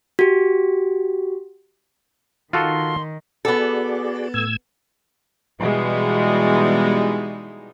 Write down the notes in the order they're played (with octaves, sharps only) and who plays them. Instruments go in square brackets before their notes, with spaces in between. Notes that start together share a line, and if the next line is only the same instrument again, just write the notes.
[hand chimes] F#4 G4
[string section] D#3 [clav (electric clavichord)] F4 F#4 A4 [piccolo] C6
[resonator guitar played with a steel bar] B3 A4 [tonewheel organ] F#4 G#4 D5
[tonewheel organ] A2 E6 G#6
[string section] B2 E3 G3 G#3 D#4